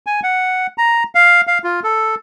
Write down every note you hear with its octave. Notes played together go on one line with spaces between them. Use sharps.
G#5
F#5
A#5
F5
F5
F4
A4